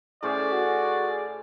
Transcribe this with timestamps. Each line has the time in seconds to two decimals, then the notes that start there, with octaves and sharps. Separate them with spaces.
0.23 A2 C#4 G#4 C5 D5
0.52 F#4